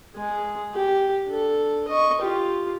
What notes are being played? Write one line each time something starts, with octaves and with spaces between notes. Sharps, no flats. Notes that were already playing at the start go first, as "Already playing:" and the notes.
G#3 G#4
G4
D4 A4
D#5 C#6
F4 G4